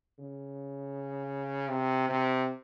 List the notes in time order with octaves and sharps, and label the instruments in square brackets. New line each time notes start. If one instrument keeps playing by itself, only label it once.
[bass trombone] C#3
C3
C3